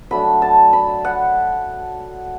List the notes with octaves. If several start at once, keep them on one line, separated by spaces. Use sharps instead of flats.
F#3 A3 D4 B5
A5
B5
F#5